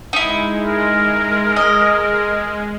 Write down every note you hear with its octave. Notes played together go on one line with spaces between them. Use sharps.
G#3 D#4 E4
A#4
D#5